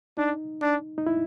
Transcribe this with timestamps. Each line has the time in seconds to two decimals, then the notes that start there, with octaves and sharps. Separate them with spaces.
0.17 D4 D#4
0.62 D4
0.98 D#4
1.07 E4